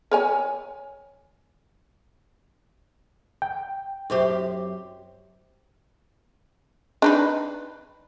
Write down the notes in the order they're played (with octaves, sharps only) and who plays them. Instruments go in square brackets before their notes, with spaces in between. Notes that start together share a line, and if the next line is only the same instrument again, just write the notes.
[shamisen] A#4 C#5 G#5
[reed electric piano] G5
[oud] F#2 C4 G4
[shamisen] D4 D#4 B4